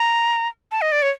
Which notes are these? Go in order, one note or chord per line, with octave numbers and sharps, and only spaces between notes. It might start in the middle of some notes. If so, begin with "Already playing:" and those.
Already playing: A#5
A5
D#5
D5
C#5